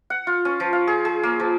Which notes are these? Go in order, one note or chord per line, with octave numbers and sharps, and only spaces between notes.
F#5
F4
C#4
F3
F5
G#4
G#4
A#3
F3